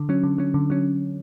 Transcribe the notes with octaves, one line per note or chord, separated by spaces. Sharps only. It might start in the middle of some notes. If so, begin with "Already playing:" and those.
Already playing: D3
F#3 C#4
D3
F#3 C#4
D3
F#3 C#4